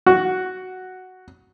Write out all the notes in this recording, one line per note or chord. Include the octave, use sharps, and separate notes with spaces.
F#4